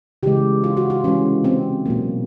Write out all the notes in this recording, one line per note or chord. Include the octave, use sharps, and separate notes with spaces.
C#3 E3 G#3 G4
F4
F#4
F4
C3 E3 G#3 C#4
C4
B2 F#3 A#3